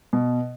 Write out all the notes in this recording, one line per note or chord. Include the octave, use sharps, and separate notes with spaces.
B2